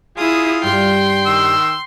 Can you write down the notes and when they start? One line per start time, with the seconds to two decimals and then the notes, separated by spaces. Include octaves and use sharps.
0.17 E4 F4 G#4 D#6
0.63 G2 G4 G5 C6
1.26 D#3 E6